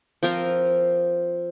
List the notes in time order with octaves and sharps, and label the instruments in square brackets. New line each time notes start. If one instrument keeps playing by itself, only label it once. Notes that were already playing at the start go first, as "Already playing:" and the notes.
[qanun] F3 C4 F4 A#4